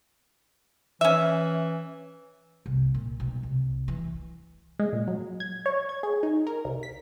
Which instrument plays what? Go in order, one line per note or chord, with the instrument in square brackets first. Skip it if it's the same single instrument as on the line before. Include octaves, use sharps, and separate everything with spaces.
[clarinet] E3 [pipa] C#4 E5
[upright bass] C2
A#2
B1
C2
E3
[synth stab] G#3
A#2
F#3
G#6
C#5
G#6
G#4
D#4
A#4
C2
B6